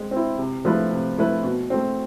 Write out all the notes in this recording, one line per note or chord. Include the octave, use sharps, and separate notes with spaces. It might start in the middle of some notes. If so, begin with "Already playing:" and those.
Already playing: G#3 C4
C4 E4
C3
F3 A3 E4 B4
C3
F3 A3 E4 B4
B2
A3 C4